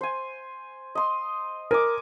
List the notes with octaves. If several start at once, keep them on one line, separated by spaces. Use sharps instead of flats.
C5 G#5
D#5 C6
A#4 G#5 D6